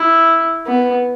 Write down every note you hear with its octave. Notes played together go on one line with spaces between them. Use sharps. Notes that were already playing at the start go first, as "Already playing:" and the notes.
Already playing: E4
B3